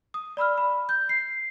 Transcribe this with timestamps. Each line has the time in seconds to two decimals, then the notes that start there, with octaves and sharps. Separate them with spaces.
0.14 D#6
0.37 D5 B5 E6 F6
0.58 B5
0.89 G6
1.09 C7